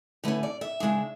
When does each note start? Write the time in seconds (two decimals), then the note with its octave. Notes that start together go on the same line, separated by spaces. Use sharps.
0.24 D3 A3 C#4 B4
0.43 D5
0.61 E5
0.80 C#3 G#3 D4